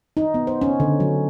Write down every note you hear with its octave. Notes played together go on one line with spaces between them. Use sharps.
D#4
B3
C5
C#4
D3
F#3